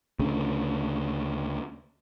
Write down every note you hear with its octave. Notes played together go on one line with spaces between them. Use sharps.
D2 C#3